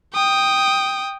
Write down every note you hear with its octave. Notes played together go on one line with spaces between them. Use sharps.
G5 D#6